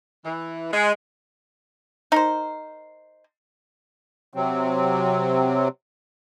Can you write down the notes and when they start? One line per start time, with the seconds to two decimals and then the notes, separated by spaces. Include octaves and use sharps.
0.25 E3
0.72 G#3
2.12 D#4 A#4 C5
4.34 C3 F#3 C4